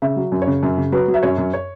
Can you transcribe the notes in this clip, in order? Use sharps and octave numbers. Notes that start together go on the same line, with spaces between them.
C#3 E5
F#3
F#2
C#5
C#3
F#2
C#3
F#3 B4
F#3
E5
F#2 C#5
F#2
C#5